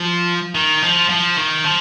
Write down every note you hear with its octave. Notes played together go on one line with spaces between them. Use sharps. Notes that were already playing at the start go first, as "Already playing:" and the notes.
Already playing: F3
D#3
F3
F3
D#3
F3